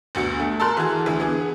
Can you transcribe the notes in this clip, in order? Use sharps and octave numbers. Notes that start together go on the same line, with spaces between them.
G1 D2 F#4 C#7
A3
A4 A#4 C6 F#6
E3 F#4 G#4
D2 D3 E3
B3 G#4